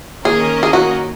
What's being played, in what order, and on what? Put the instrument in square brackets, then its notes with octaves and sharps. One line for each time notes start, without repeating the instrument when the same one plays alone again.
[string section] D#3 A#3 C#4 A#4 D#5 [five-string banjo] G#4
[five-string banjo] G#4
F#4